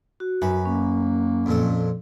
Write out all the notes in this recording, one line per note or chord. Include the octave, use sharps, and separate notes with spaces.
F#4
F#2 B4
A#3 C#4
F2 A#2 A4